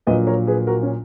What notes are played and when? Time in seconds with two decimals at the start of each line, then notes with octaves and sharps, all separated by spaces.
0.07 A#1 A#2 F#3 B4 D#5
0.27 A#4 C#5
0.47 G#4 B4
0.67 F#4 A#4
0.83 C#4